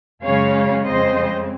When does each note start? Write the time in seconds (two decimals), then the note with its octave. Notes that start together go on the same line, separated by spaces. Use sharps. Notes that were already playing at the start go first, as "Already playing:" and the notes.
0.23 F#2 C#3 G#3 C#4 C#5 F5
0.84 F2 C#3 G#3 C4 C5 D#5